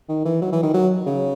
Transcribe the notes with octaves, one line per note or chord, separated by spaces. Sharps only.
D#3
E3
F#3
E3
D#3
F#3
C#3